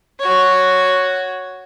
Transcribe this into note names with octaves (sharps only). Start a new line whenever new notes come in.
F#4 C#5